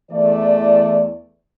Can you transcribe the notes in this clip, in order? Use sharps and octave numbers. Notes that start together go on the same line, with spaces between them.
E2 E3 A3 D5